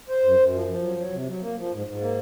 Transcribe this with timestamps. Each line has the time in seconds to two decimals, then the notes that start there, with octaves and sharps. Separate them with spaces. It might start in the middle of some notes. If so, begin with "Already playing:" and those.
0.09 C5
0.24 F#2
0.39 F#2
0.53 F3
0.68 F3
0.83 F#3
0.97 F#3
1.13 C3
1.27 F#3
1.41 A#3
1.57 F3
1.72 G#2
1.86 G#2
2.01 A#3